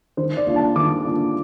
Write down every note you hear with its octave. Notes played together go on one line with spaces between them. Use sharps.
D#3 C5
D5
A#3 D4 F4
A5
D#3 D6
A#3 D4 F4